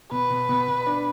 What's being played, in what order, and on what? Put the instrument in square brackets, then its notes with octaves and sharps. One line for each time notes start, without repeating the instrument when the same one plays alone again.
[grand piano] B2 [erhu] B4
[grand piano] B2
B2
B2
D4